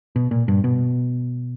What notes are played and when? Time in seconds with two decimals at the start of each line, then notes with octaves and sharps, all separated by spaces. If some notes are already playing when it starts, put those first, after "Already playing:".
0.16 B2
0.31 A#2
0.48 G2
0.64 B2